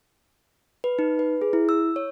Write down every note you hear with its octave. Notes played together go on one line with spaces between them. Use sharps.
B4
D#4
B4
G#4
E4
E6
C#5